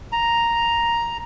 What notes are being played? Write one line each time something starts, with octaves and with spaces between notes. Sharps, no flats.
A#5